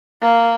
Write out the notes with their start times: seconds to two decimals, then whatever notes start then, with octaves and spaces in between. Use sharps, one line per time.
0.22 A#3